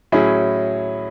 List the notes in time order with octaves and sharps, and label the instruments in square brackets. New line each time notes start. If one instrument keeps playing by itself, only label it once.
[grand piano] A2 F#3 C#4 E4 G#4